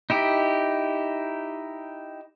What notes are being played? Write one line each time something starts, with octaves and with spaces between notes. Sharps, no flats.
D#4 E4 G4